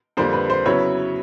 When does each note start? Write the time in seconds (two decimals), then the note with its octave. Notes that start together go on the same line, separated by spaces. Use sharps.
0.17 F2 D3 G3 A#3 C5
0.33 B4
0.50 C5
0.65 C#3 F#3 B3 E4 B4 C#5